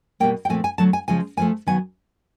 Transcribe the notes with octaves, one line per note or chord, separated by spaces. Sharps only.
B2 G3 A#3 G5
G5
A#2 F3 A3 C4 G#5
G#5
D3 F#3 A3 A5
G#5
C#3 F3 G#3 G#5
A#2 F3 A3 G#5
D#3 F#3 B3 G#5